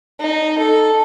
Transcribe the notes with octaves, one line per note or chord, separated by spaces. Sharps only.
D#4
A4